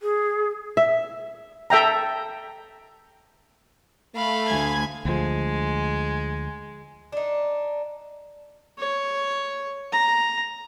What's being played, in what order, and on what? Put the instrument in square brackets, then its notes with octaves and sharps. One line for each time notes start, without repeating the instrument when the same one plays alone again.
[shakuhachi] G#4
[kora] E5
[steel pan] A4 E5 G5 A#5
[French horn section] A3 [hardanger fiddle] F5 B5
[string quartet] D2 G#5 G#6
[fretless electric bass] D2 F3 [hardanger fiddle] G#3
[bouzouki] D4 D#4
[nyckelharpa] C#5
A#5